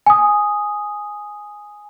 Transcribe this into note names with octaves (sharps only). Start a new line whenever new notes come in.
G#5 D#6